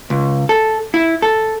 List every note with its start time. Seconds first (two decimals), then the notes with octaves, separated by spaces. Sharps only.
0.10 C#2
0.49 A4
0.94 E4
1.22 A4